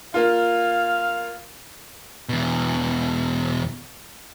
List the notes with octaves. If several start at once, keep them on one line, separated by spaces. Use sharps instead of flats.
A#3 F4 F5
E2 B2